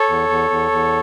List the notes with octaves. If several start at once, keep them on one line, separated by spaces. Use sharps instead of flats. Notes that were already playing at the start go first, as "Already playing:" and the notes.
Already playing: A4 C#5
E2
E2
E2
E2